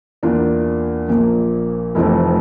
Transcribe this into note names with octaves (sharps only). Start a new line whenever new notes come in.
E2 E3 A#3 D4 F4
A#1 A#2 F3 A#3
F1 F2 E3 A3 C4